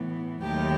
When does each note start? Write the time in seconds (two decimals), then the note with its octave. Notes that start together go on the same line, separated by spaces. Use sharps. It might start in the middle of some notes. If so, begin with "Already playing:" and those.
Already playing: A2 E3 B3
0.41 D#2 D#3 F#3 A3 G4